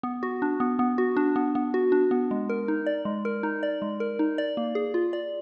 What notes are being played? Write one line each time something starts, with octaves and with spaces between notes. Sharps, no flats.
B3
F#4
D4
B3
B3
F#4
D4
B3
B3
F#4
D4
B3
G#3
A#4
D#4
D5
G#3
A#4
D#4
D5
G#3
A#4
D#4
D5
A#3
G#4
F4
D5